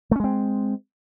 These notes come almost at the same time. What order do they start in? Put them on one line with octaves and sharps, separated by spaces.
A3 C#4 G#3 C4